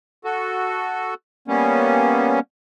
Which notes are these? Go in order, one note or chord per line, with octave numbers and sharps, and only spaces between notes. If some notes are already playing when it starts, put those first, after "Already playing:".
F#4 A4
G3 A#3 B3 C#4